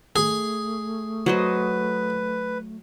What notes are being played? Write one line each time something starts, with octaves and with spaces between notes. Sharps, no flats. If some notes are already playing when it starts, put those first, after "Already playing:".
A3 G#4
F#3 B4 C5 D#5